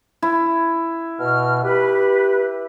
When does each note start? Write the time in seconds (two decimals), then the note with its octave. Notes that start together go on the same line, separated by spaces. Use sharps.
0.22 E4
1.20 B2 F6
1.64 G4 B4